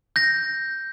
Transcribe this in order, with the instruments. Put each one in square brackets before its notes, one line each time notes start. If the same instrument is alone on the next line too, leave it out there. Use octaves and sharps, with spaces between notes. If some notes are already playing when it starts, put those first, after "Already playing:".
[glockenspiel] G6 A#6